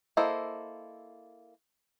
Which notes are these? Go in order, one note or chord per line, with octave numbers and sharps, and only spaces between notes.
A#3 E4 A4 C5 D#5